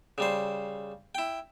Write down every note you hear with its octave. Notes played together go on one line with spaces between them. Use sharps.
C#3 G3 C5
E4 G5